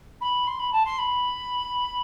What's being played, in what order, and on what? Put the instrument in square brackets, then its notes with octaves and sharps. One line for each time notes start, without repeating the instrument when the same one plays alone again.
[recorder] B5
C6
B5
A5
C6
B5